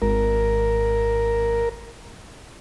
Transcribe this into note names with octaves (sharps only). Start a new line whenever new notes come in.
G#1 A#4